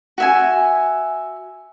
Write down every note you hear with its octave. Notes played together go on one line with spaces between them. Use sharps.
F#4 E5 G#5